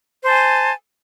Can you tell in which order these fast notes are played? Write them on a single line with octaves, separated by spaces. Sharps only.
C5 A5 G#5